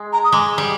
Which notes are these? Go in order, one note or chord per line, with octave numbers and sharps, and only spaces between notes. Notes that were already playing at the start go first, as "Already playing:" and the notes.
Already playing: G#3
A#5
D#6
G#3 D6
D6
G3